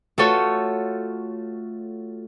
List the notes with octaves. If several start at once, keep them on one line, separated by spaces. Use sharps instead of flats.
A3 F4 F#4 A4 C#5